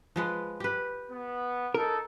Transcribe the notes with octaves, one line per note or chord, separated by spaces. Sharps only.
F3 G#3 B4
G4 B4
B3
D#4 A4 A#4